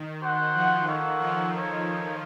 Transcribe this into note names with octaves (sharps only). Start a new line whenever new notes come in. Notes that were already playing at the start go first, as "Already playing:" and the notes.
Already playing: D#3
F#4 C5 F#5
F3
D#3 A#3 F4 A4 C#5 F#5
F3
D#4 A4 C#5